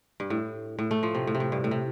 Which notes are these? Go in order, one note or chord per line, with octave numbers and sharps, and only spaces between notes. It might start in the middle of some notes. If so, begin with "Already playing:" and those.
G2
A2
A2
A3
F3
C3
A2
C3
A2
G2
A2
C3